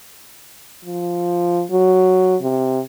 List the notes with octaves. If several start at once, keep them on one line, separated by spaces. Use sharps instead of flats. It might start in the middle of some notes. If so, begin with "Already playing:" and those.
F3
F#3
C3